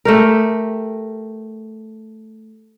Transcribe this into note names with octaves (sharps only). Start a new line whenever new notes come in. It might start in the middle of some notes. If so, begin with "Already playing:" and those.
A3 G4 A#4